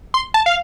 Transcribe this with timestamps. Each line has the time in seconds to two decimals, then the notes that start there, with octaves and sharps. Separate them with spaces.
0.14 C6
0.34 A5
0.46 F5